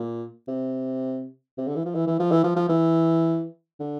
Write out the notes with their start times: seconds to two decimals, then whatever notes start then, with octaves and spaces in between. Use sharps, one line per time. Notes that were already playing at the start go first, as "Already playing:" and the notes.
Already playing: A#2
0.48 C3
1.58 C3
1.67 D3
1.76 E3
1.85 F3
1.94 E3
2.07 E3
2.20 F3
2.31 E3
2.44 F3
2.56 F3
2.69 E3
3.80 D3